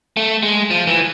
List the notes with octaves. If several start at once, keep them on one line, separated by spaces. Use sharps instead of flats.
A3
G#3
F3
E3